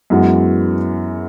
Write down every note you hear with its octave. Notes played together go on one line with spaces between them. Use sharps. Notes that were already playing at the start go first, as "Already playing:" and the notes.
F#2 E3 G#3 B3 F#4